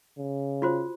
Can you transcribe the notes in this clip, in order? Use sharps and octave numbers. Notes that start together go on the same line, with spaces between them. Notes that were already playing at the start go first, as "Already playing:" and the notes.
C#3
F4 F#4 C5